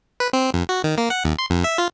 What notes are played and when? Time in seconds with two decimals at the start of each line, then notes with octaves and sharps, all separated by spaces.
0.20 B4
0.33 C4
0.54 F2
0.69 F#4
0.84 D#3
0.98 A#3
1.10 F#5
1.24 D#2
1.39 C6
1.50 F2
1.64 E5
1.78 F4